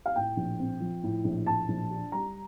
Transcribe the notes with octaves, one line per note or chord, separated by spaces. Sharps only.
F5
A2 G5
A#1
C4
F3
A2
A#1
A2 A5
A#1
D4
G3 A#5